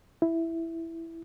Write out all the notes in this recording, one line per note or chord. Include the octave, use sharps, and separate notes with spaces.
E4